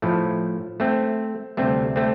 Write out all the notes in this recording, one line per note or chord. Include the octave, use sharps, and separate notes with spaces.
A2 F3 A3
A3 C4
D2 C3 G3 A3 C4
A3 C4